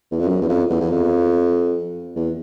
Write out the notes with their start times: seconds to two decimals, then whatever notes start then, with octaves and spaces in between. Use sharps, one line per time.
0.11 E2
0.20 F2
0.28 F#2
0.41 E2
0.49 F2
0.70 E2
0.81 E2
0.90 F2
2.16 E2